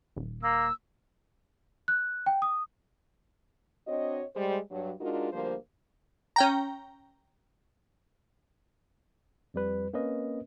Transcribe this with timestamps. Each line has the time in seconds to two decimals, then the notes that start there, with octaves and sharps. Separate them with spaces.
0.16 D#1
0.43 A#3 E6
1.88 F#6
2.26 G5
2.42 D#6
3.87 C4 D4 F#4 C#5 D#5
4.35 G3 G#3 C5
4.71 G2 F#3
5.01 G#3 D4 D#4 F4 F#4 A#4
5.33 D2 F3 G3 A#3 C5
6.36 C#4 G5 A#5
9.54 F2 G3 B4
9.93 A#3 C4 C#4 A#4 B4 D#5